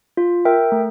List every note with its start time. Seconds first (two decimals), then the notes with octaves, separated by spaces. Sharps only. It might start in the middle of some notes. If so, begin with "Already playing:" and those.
0.17 F4
0.45 A#4 E5 G5
0.72 A3